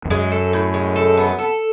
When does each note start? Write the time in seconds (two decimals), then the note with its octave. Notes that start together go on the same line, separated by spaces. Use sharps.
0.05 F2
0.10 F#2 G#3
0.32 A4
0.53 A2
0.74 G#3
0.96 A4
1.17 B3
1.39 A4